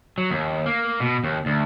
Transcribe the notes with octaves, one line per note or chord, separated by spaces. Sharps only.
F#3
D#2
A#3
B2
D#2
D2